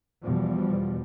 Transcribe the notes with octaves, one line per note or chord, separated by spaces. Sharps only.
E2 B2 F3 G3